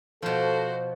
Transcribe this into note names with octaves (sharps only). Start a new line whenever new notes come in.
B2 F3 F#4 A4 C5